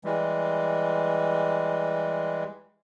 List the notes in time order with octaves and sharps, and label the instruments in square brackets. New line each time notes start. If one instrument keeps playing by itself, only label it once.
[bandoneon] E3 G3 G#3